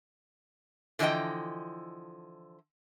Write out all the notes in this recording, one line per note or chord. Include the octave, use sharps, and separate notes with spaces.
D3 E3 F3 F4 D#5 G5